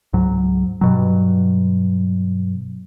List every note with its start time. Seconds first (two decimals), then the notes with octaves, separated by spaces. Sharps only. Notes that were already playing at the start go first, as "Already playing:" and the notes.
0.13 C#2 G#2 F#3
0.81 G2 B2 F#3